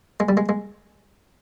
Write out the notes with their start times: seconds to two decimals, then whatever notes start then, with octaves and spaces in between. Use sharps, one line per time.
0.20 G#3
0.29 G3
0.37 G#3
0.49 G#3